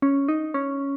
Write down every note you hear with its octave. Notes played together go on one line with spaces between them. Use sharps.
C#4
D#4
C#4